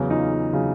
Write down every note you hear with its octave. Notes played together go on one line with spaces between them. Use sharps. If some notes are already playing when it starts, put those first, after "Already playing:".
Already playing: E2 C#3 F#3
D#4 F4
C#3 F#3